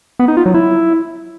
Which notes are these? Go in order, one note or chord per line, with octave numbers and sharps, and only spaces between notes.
B3
D#4
F4
F#3
E4